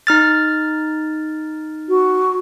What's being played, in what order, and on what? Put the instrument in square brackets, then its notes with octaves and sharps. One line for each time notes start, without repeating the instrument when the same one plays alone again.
[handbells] D#4 F6 A6
[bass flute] F#4